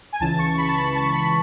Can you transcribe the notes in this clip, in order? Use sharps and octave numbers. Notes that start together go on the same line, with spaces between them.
G#5
C#2 C#3 E3 A5
C#6
B5
A5
B5
A5
B5